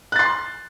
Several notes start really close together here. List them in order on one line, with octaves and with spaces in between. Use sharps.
F#6 A6 C6